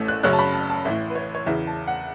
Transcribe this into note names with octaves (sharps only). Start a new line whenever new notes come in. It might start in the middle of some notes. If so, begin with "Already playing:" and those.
Already playing: A1 A2 A3 C#4
F#6
F#2 C#3 F#3 C#4 F#6
A5
B5
A5
A5
A1 A2 E3 E5
B4
C#5
C#5
E2 C#3 E3 E5
A5
F#5